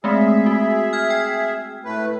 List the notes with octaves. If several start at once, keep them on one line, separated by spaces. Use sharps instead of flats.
G#3 A3 C4 G#4 E5
F#4
F6 G#6
G5
A2 A3 B4